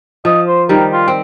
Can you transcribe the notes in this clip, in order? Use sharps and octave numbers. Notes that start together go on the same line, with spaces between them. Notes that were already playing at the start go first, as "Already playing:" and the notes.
F3 D#5
C5
D#3 G3 A#4
F4
C4